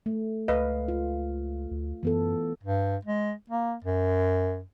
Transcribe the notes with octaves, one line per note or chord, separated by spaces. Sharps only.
A3
C#2 B4 D#5 F5
F4
D2
F#2 E3 B3 A4
G2
G#3
A#3
F#2